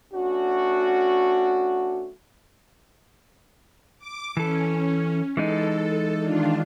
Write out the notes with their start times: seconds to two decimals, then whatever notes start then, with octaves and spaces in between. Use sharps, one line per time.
0.13 A3 C#4 D4 F#4
3.98 D6
4.37 E3 C#4 A4
5.37 E3 G#3 D#4 A4
6.20 D#3 D4 F4